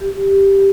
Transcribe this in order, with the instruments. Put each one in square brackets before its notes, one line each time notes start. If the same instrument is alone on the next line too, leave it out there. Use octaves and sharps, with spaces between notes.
[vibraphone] G4